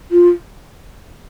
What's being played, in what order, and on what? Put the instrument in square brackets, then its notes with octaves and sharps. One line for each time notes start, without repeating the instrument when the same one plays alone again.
[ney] F4